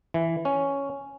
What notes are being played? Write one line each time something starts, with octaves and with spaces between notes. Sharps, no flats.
E3
C#4